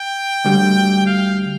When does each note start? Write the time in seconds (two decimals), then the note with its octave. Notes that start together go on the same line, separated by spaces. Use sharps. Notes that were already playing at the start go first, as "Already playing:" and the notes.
Already playing: G5
0.45 D2 D3 G3
1.06 F5